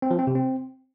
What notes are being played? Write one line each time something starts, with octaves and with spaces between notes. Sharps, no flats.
C4
F3
C4
C3
C4